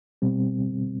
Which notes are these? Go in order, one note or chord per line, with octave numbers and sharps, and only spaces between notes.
B2 G3 C4